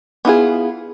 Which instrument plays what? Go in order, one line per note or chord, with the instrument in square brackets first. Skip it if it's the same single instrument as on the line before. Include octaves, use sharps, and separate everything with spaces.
[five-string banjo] B3 E4 F4 G#4